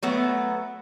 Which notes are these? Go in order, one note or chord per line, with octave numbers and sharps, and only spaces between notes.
F#3 A3 B3